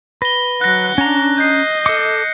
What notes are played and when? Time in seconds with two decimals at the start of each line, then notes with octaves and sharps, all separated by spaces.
0.22 B4 A#6 G7
0.61 F#3 F#5 F#6 A#6
0.98 C#4 D4 A#5
1.38 D#5 G6 C7
1.86 A4 D6 C#7